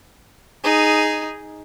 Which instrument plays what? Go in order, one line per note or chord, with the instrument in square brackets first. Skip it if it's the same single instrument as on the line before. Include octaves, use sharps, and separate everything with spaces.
[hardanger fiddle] D#4 G#4